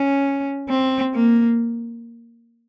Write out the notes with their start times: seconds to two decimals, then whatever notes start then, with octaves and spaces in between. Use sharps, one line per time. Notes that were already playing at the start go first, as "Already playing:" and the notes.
Already playing: C#4
0.70 C4
1.14 A#3